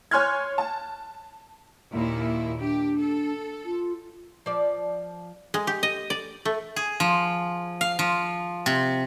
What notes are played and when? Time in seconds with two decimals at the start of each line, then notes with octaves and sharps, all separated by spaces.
0.11 C#5 G#5 C6 F6 F#6 G#6
0.58 A5
1.92 D#2 A#2 E4
2.60 D4 G4
2.97 A4
3.65 F4
4.46 F3 D5
5.54 G#3
5.67 G4
5.83 D#5
6.10 D5
6.45 A3
6.76 G#4
7.00 F3
7.81 F5
7.99 F3
8.66 C3